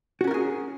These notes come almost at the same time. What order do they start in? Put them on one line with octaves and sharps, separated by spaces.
F#4 C#4 A#4 F4 G#4